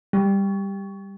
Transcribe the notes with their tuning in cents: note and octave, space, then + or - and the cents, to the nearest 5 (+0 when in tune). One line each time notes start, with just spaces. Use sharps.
G3 +10